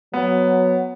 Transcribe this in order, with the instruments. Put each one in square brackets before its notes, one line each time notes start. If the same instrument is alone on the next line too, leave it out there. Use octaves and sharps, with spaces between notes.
[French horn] F#3 [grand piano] B3